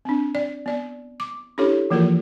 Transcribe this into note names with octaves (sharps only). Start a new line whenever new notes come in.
C4 D4
D5
B3 D5
D6
C#4 D4 E4 G4 A4 C#5
E3 F3 A#3 F4 G#4 A#4